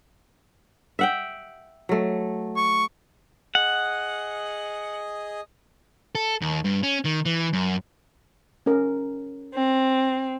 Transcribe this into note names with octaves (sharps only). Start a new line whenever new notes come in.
E5 F#5 G5
F#3 A3
C#6
G#4 D#5 F#5
A4
D#2
G2
C#4
D#3
E3
F#2
C#4 A#4
C4